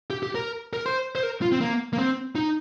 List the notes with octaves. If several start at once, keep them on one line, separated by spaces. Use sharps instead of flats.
G4
G4
A#4
A#4
C5
C5
A#4
F4
C4
A#3
A#3
C4
D#4